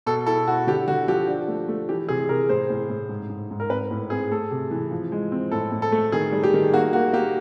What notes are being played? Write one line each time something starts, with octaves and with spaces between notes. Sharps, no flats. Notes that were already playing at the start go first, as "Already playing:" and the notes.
B2 A4
E4 A4
E4 F#4
D3 G4
D3 F#4
F3 G4
D4
A3
A3
E3 G4
C3 G#4
C3 A#4
A2 C5
A2
A2
G#2
G#2
G#2
A#4
C4 B4
A2
C4 G#4
A3 A4
C3
E3
F3
G#3
C4
A2 A4
A2
A4
A3
D#3 G#4
G3
G4
D#3
A#3 F#4
A#3 F#4
A#3 G4